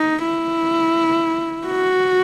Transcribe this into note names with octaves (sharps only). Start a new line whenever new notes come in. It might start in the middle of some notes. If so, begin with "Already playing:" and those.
Already playing: D#4
E4
F#4